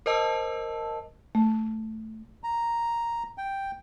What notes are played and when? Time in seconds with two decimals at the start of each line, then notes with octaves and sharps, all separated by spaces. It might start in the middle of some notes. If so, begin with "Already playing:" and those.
0.06 A#4 C5 D#5 A5 E6
1.35 A3
2.44 A#5
3.38 G5